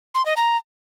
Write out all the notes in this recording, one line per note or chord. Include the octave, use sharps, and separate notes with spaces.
C6
D#5
A#5